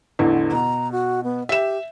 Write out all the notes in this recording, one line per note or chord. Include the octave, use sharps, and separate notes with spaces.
A1 E2 D3
B2 A#5
F#4
B3
G4 E5 E7